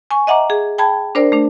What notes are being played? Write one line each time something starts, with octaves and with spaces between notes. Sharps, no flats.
G#5 C#6
D#5 E5 F#5 A#5 D6
G#4
G5 A5 B5 G#6
D4 A#4 C5 D5
A3 D4